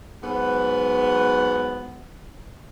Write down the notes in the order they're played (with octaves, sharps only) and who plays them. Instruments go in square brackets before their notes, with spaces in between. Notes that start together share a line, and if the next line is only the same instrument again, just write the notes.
[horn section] G#2 F#3 B3